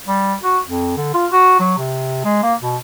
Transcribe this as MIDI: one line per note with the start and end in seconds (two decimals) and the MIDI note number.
0.08 0.34 55
0.43 0.59 66
0.66 0.96 41
0.97 1.12 50
1.14 1.27 65
1.32 1.55 66
1.59 1.76 54
1.78 2.20 48
2.24 2.42 56
2.43 2.54 58
2.61 2.77 47